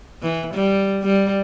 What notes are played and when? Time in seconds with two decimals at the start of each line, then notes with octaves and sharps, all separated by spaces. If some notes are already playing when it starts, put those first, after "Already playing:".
0.22 E3
0.54 G3
1.03 G3